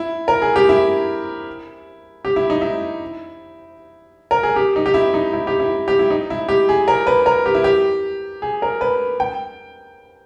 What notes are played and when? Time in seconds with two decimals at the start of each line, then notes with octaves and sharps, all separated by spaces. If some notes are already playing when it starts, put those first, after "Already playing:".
Already playing: E4
0.28 A#4
0.42 G#4
0.56 G4
0.69 E4
2.25 G4
2.36 E4
2.50 D#4
2.61 E4
4.31 A#4
4.43 G#4
4.56 G4
4.76 D#4
4.86 G4
4.94 E4
5.14 D#4
5.33 E4
5.47 G4
5.59 E4
5.88 G4
5.99 E4
6.10 D#4
6.30 E4
6.49 G4
6.69 G#4
6.88 A#4
7.07 B4
7.26 A#4
7.46 G4
7.55 E4
7.64 G4
8.42 G#4
8.62 A#4
8.81 B4
9.20 G5